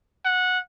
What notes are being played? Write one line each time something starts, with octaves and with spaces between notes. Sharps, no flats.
F#5